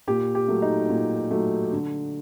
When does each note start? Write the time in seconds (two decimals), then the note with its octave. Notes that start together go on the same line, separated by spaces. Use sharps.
0.08 A#2 G4
0.35 G4
0.48 F#3 A3
0.62 D#4
0.90 A#2
1.31 F#3 A3
1.72 D3